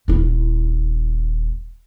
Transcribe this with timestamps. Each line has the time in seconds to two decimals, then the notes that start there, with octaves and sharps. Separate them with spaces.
0.08 D#1 E4